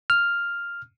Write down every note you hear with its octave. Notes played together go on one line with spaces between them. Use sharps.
F6